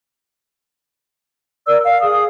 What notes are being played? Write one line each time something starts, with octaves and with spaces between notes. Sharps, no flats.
A#4 D5 E6
F5
G#4 D#6